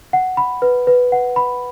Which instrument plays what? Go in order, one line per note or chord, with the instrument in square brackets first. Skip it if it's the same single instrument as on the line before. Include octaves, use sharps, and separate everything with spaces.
[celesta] F#5
B5
B4
B4
F#5
B5